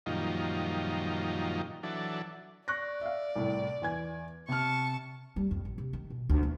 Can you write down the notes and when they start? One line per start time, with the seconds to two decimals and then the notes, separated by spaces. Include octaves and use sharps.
0.06 F#2 A#2 D#3 F3 G3 D#4
1.83 E3 F#3 D4 A4
2.68 D5 C#6 F#6 A#6
3.01 E5 F5
3.36 C2 A2
3.82 E2 G#5 G#6
4.49 C3 A5 C#6 F6
5.36 G3
5.51 F2
5.65 A1
5.78 C3
5.93 D#3
6.10 B2
6.29 D2
6.43 E2